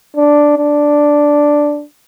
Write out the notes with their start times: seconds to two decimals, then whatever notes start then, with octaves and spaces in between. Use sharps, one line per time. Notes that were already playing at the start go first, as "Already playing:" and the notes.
0.16 D4
0.57 D4